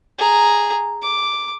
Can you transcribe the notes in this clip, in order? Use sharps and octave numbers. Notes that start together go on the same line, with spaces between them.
G#4 A#5
D6